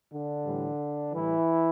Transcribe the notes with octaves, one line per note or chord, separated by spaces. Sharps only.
D3 D4
A2 E3 G3
A2 E3 G3 E4